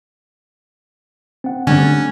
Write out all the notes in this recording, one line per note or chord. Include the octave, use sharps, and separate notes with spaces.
C4 F#5
D3 G3 A3 C#4 D4